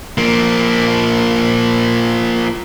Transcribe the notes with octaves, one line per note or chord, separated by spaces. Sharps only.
F3 A#3